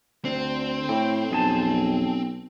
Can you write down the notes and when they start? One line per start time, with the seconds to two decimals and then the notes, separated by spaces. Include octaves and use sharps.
0.25 D2 D3 C4
0.89 A2 G5
1.31 B1 F2 G#4 A5